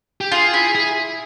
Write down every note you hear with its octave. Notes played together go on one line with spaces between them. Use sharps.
G4
F4 G#4
E4
G#4